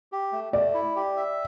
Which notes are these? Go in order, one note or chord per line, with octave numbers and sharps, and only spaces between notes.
G4
A3
A3 D5
E4
G4
E5